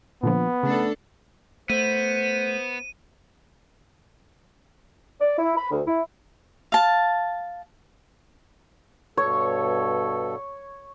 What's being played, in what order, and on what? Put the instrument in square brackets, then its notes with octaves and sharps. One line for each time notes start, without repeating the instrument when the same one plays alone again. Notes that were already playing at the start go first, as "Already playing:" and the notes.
[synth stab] A#2 D3 F3 [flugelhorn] B3
[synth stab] C#3 [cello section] A3 D4 A4
[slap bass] A3 [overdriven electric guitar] B3 [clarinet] C5 [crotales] D#7
[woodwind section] D5
E4
B5
D2
E4
[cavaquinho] F5 A5
[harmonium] G2 B2 A4 [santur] C#5